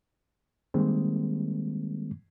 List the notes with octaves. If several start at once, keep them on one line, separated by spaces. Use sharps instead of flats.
D#3 G3 G#3 A#3 C4